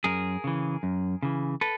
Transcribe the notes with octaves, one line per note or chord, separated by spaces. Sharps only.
F#2 G#4 A#4
C#3 E3
F#2
C#3 E3
A4 B4